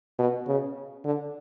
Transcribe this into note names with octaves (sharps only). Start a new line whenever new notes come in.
B2
C#3
D3